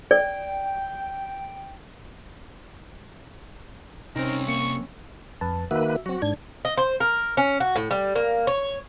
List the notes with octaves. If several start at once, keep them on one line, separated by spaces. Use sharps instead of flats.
D5 G5
C2 C4 C#4 D#4 A#4 C5
A#3 C#6
F2 B4 A5
D#3 A#3 F#4 B4 E5
F#3 C4 F#4
G#2 D4 G#6
D#5
C5
A#4
C#4
F#4
A2
G3
A#3
C#5